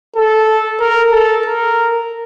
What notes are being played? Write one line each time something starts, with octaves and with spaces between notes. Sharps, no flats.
A4
A#4
A4
A#4